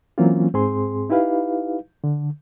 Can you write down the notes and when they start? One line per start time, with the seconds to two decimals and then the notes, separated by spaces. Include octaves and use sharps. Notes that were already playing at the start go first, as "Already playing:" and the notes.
0.18 E3 F#3 A#3 C4 C#4 F4
0.54 G#2 C4 G#4 C6
1.10 D#4 E4 G4 B4 F5
2.04 D3